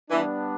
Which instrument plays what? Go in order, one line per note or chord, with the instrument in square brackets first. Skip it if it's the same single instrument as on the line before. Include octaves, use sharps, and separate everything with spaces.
[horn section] E3 [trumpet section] G3 B3 D4